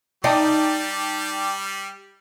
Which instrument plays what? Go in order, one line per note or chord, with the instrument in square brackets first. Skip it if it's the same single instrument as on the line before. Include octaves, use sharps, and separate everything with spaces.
[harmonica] G3 G4 [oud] D#4 [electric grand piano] D5 G5 A5